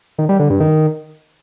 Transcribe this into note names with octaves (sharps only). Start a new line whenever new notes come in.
D#3
G3
D3
G2
D#3